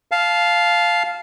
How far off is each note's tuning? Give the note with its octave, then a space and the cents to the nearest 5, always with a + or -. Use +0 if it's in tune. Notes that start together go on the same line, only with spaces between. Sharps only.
F5 +0 A5 -20